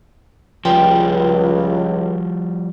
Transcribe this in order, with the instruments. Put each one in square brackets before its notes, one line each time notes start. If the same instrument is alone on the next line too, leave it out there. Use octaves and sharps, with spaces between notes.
[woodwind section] C#2 [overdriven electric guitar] F3 G3 [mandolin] G5 C6 D#6